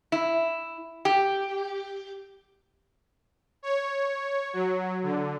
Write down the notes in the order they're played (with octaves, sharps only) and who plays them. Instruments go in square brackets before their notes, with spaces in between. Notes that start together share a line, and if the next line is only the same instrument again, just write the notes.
[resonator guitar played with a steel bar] E4
G4
[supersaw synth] C#5
F#3
D3